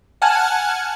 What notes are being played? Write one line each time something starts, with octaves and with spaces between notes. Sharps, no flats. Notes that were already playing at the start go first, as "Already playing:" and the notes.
F#5 G#5 A5 F6 F#6 G#6